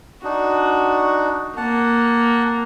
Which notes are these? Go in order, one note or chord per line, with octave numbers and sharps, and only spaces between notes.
D4 D#4 F#4
A#3 F#5 A5